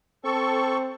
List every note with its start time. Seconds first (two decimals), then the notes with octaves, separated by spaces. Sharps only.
0.24 C4 A4 C#6